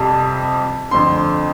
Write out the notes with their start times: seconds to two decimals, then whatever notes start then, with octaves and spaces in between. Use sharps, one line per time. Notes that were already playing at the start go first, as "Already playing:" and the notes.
Already playing: F2 C3 G3 A5
0.91 F2 D3 A3 C4 C6